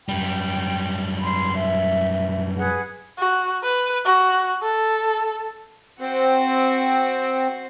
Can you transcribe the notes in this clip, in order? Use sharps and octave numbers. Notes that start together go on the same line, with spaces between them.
F#2 G3 G5
B5 C6
E5
G#4 B4 F#5
F#4
B4
F#4
A4
C4 F#4 C5